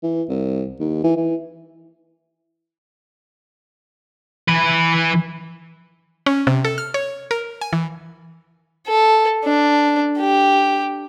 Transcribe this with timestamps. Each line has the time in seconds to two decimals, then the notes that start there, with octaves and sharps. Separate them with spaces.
0.03 E3
0.29 C2
0.80 D#2
1.04 E3
1.17 E3
4.49 E3 B4
6.26 C#4
6.47 C3
6.65 A4
6.78 F6
6.94 C#5
7.31 A#4
7.61 G#5
7.73 E3
8.88 A4
9.44 D4
10.18 G4